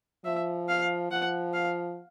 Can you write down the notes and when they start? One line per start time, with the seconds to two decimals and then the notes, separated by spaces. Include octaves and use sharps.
0.25 F3 E5
0.68 F5
1.11 F3 F#5
1.54 F5